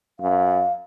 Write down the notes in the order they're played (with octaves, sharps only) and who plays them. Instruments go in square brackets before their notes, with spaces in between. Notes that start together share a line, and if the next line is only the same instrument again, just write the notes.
[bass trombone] F#2 [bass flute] F5